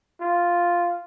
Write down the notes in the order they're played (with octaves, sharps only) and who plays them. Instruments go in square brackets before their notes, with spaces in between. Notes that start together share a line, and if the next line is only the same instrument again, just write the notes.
[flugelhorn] F4